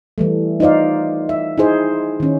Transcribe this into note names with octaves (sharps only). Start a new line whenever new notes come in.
E3 G3 A3
D#4 F4 C5 D5 F5
E5
D#4 E4 G#4 C5
D#3 C#4